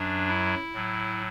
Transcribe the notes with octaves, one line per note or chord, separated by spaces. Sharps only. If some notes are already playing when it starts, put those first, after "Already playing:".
Already playing: F#2 F#3 D4
E4
A2 F#3